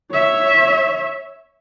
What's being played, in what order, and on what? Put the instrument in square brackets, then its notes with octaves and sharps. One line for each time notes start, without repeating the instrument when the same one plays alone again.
[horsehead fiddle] C#5 E5